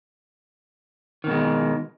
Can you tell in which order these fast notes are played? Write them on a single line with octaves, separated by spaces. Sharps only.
D#3 B2 G#3